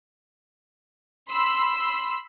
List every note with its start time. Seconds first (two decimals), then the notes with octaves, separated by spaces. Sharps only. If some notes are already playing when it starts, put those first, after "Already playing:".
1.31 B5 C6 E6